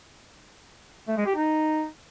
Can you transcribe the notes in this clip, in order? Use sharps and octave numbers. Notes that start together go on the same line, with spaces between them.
A3
G#3
G4
D#4